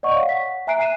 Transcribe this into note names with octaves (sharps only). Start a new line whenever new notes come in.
D5 D#5 F#5 C#6
C#5 F5 F#5
F#5 B6
E5 G#5 A#5 F#6 C7 D7
F#6 C7 D#7 E7